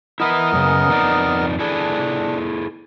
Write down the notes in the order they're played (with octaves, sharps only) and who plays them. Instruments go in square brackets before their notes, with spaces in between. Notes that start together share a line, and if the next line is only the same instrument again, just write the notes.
[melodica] B3 A#4 D#5 [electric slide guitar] E4 B4 E5
[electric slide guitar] F#2 A2 C#3
F2 D#4 D5
[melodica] D4 [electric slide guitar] E4 G#4 A4